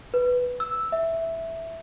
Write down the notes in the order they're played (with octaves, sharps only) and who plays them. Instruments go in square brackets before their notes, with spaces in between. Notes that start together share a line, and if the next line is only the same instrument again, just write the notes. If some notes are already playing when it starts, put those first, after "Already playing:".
[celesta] B4
E6
E5